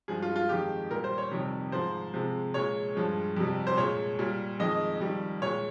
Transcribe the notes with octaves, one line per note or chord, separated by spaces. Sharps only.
G2 F3 G#3 G#4
F4
F4
F2 D#3 G#3 G4
A#2 G3 A#4
C5
C#5
F2 C3 D#3 G3
G#2 F3 G#3 C5
C3 F3 G#3
A#2 G#3 C#5
G2 F3 G#3
F2 C3 G3
C5
A#2 G#3 C#5
A#2 G3
F2 D#3 G#3 D#5
F2 D#3 G3
A#2 G#3 C#5